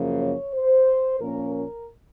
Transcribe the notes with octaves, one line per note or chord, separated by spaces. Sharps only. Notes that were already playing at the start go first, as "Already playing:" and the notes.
Already playing: F#2 C#3 F3 A#3
C#5
C5
A#2 F3 A#3 C#4 A#4
A#4